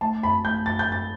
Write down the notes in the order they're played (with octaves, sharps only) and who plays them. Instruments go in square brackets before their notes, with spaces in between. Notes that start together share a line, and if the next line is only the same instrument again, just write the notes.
[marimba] A3 [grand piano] A5
[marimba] F#2 [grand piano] B5
[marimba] A3 [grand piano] G6
[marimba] F#2 [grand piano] A6
[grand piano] G6
[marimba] F#2 [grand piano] A6